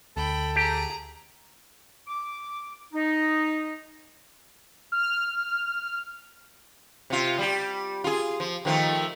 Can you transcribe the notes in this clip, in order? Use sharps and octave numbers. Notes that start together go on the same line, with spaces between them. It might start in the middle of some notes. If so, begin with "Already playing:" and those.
D2 A4 G5 B5
G4 G#4 A#5
D6
D#4
F6
C3 F4
G3 G4
F4 G#4
F3
D#3 F3 A3